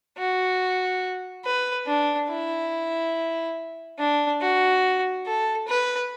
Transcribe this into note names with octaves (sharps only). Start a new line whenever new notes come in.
F#4
B4
D4
E4
D4
F#4
A4
B4